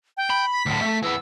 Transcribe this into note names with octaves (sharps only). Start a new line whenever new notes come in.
G5
B5
B6
D2 A2
A3
E3 B3 E6